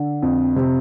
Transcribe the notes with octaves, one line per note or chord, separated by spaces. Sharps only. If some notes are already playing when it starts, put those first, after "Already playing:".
Already playing: D3
F2
C3